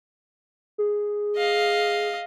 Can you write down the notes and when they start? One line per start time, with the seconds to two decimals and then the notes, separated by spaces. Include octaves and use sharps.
0.78 G#4
1.37 D#5 F5